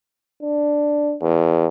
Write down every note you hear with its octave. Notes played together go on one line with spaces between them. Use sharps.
D4
E2